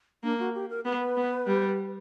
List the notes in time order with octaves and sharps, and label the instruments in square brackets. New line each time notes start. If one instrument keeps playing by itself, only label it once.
[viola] A#3 [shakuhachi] D4
[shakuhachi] F#4
G4
A#4
[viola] B3 [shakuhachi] B4
[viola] B3
G3